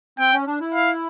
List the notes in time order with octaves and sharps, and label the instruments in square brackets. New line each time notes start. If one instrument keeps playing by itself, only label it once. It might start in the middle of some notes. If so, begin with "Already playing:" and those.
[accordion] C4 [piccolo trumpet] G5
[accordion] C#4
D4
E4
[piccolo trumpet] F5